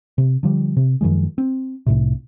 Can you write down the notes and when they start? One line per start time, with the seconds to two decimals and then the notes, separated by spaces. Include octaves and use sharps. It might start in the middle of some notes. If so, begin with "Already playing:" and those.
0.18 C3
0.43 D3 F3 G3
0.77 C3
1.01 F#2 D#3 F3 G#3
1.38 C4
1.86 C2 A2 C3